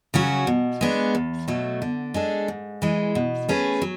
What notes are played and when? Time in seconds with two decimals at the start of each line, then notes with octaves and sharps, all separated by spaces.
0.14 C#3 F#3 C#4 F#4
0.47 B2
0.81 G#3 B3 D4
1.15 E2
1.48 B2 F#3 A3
1.82 D3
2.14 G#3 D4 A4
2.48 G#2
2.82 E3 G#3
3.15 B2
3.49 A3 C#4 G#4 B4
3.82 F#3